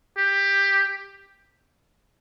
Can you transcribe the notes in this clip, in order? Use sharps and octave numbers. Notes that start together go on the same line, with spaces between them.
G4